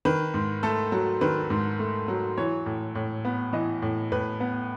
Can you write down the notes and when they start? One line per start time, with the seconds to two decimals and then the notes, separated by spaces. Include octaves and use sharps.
0.05 D#3 B4
0.34 G#2
0.63 A3 A4
0.92 F#3
1.21 D#3 B4
1.50 G#2
1.79 A3
2.08 F#3
2.37 E3 C#5
2.66 A2
2.95 A2
3.25 B3
3.53 E3 D#5
3.82 A2
4.12 A2 B4
4.40 B3